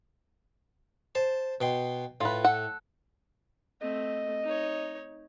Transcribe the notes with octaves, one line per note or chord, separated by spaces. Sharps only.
C5 A5
B2 G5 C6
A2 F4 B4
A4 F#5
A3 C4 D#5
D#4 C#5